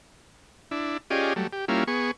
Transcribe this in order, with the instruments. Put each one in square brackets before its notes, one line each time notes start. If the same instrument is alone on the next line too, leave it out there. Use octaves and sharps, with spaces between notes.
[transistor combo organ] D4 E4
C#4 F4 G4 G#4 D5 D#5
F#3 G3 A3
G4
G3 A#3 C#4 E4 F4
B3 G#4 C#6